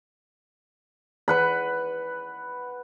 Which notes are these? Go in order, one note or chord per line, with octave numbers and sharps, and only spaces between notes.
B4 F#5 B5